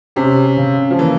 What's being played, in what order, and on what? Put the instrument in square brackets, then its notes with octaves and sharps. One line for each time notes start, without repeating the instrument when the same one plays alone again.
[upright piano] C3 [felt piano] C#4
[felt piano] C#3
[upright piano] F3
[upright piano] E3 [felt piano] A#3